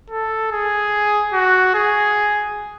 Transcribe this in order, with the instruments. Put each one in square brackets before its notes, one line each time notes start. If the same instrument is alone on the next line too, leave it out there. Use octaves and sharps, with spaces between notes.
[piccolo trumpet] A4
G#4
F#4
G#4